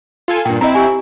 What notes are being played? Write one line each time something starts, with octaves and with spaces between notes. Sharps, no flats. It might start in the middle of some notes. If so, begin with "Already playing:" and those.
F4 A4 G#5
G2 A#2 G5
C4 E4 D#5 A#5
G4 G#5